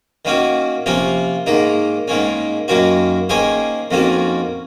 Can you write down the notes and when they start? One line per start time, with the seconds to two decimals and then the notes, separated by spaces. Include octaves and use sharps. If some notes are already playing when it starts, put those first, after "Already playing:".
0.25 D#3 A#3 C#4 F#4
0.86 C3 F3 A#3 C#4 F4
1.46 G#2 D#3 A#3 D#4
2.08 G#2 D#3 A#3 C#4
2.68 F#2 D#3 A#3 C#4 F#4
3.29 D#3 A#3 C#4 G#4 C5
3.91 F2 D#3 A#3 C#4 F#4